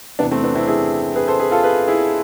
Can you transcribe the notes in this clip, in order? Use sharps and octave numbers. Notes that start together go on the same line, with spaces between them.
E2 C3 E3 B3 D4
A3 C4
B3 D4
C4 E4
E4 G#4
G#4 B4
A4 C5
G#4 B4
F4 A4
G#4 B4
E4 G#4